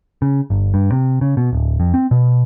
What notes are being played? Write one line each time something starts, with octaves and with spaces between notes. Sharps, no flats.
C#3
G1
G2
C3
C#3
B2
D1
F2
C4
B2